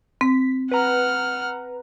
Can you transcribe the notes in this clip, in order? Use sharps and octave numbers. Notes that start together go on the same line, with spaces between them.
C4 B6
B4 F#5 A#5 F6